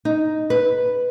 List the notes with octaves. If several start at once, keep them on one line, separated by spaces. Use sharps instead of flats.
D#4
B4